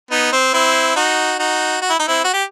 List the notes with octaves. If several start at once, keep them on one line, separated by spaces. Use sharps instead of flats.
B3 D#4
C4
C4 E4
D#4 F#4
D#4 F#4
F#4
E4
D#4
C4 E4
F#4
G4